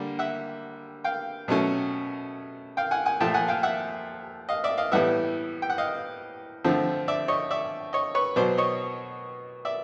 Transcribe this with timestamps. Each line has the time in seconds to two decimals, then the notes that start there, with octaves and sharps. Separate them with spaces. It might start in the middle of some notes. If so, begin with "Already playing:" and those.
Already playing: D3 G3 A#3
0.19 E5 F#5
1.04 F5 G5
1.48 B2 F#3 A3 C#4
2.77 F5 G5
2.91 F#5 G#5
3.06 F#5 G#5
3.20 A#2 F3 A3 G5 A5
3.34 F#5 G#5
3.48 F5 G5
3.63 E5 F#5
4.49 D#5 F5
4.64 D5 E5
4.78 D#5 F5
4.92 A2 E3 G3 B3 E5 F#5
5.62 G5
5.70 F#5
5.78 D#5 F5
6.64 D3 F3 A3 C4
7.08 D5 E5
7.28 C#5 D#5
7.51 D5 E5
7.93 C#5 D#5
8.15 B4 C#5
8.36 B2 F#3 B3 C5 D5
8.58 C#5 D#5
9.65 D5 E5